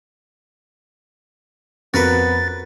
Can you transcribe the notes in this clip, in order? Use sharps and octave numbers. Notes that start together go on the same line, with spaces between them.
F2 B3 F#4 A#4 B4 A6